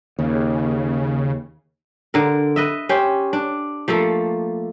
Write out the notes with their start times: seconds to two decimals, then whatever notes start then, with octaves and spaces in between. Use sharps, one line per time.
0.19 D#2 C#3
2.14 D3 A#4
2.56 B4 D#5 E5
2.89 C#4 G4 C5
3.33 D4
3.88 F3 A3 A#3 A4